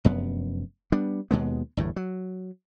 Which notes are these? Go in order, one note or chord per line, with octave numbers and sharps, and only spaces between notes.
F1 F#2 B3
G3 B3 D4
D#2 B2 G#3 B3
G1 E2 A2
F#3